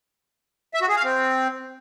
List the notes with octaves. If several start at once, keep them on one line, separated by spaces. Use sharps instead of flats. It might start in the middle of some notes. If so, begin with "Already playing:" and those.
E5
F#4
G#4
F5
C4